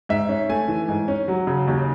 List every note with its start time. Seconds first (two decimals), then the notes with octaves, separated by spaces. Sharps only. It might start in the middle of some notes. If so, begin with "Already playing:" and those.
0.09 G#2 E5
0.29 C#4
0.49 A3 G#5
0.68 E3
0.89 G#2
1.08 C#4
1.28 F#3
1.47 C#3
1.67 D#2